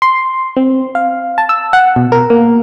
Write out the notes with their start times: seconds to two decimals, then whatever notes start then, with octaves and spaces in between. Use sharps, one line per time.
0.02 C6
0.56 C4
0.95 F5
1.38 A5
1.49 E6
1.73 F#5
1.96 B2
2.12 A#4
2.30 A#3